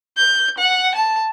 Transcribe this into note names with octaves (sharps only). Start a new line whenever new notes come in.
G6
F#5
A5